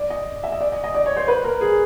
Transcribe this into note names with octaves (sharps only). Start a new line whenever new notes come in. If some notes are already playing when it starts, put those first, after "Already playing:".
Already playing: D5
D#5
E5
D#5
D5
D#5
D#5
D5
C#5
C5
B4
A#4
G#4